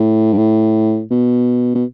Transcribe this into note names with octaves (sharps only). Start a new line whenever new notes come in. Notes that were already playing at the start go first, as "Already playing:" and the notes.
Already playing: A2
G2
A2
B2
B2